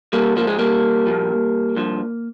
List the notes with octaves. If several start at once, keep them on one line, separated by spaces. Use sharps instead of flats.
G3 A#3
G#2 F3 A#3
G#3
G3 A#3
A#2 F3
G2 F3